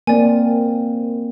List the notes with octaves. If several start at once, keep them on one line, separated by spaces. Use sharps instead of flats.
A#3 C4 D5 G#5